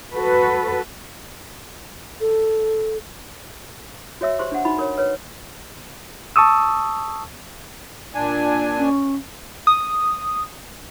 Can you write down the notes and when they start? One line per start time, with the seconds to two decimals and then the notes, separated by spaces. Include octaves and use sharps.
0.12 F#4 A4 B4
2.21 A4
4.21 F#4 C#5 E5 E6
4.39 G4 C5 C6 C#6
4.52 D4 F#5
4.65 D#4 F#4 B5
4.79 A#4 C#5
4.98 B4 C#5
6.36 A5 C#6 D#6 E6
8.15 A#2 D4 G#5
8.77 C#4
9.67 D#6